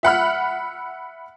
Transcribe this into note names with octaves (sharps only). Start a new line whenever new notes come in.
E5 F#5 B5 F6